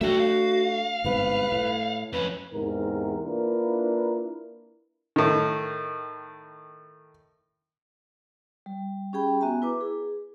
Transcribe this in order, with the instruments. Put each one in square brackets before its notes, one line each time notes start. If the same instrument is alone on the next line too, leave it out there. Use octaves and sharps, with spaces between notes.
[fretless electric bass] A3 D4 [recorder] F#4 [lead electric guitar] E5 G5
[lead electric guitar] F5
[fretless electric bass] G1 G#2 C3 [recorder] B4
[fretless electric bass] A2
[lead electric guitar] F2 C#4 [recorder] B4
[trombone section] E2 G#2 C3 A#4
A#3 D4 E4 F4 A#4 B4
[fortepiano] A2 D#3
[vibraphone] G3
C#4 G4 G#4 G5 B5
B3 F#4 E5 G#5 A#5
E4 B4 D6
G#4